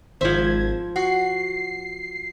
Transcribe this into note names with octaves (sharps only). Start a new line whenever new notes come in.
G#1 F3 C5 E5 G#6
F#4 C7